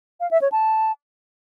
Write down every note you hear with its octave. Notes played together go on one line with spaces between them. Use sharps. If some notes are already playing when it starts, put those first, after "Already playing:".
F5
E5
C#5
A5